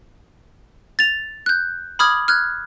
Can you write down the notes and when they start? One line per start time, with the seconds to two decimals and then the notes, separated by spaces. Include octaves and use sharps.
0.99 A6 F7
1.46 F#6 G6
1.99 B5 D6 D#6 F6 G#6 F#7
2.28 F6 F#6 G#6